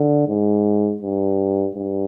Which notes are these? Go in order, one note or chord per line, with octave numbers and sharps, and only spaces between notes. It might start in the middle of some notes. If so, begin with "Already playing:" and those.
Already playing: D3
G#2
G2
G2